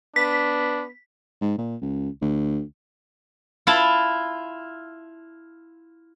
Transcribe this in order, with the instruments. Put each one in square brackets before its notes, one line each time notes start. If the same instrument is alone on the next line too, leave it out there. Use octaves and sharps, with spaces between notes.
[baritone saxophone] B3 [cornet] D4 [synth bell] B6
[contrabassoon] G#2
A#2
C#2
D2
[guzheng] E4 F4 A5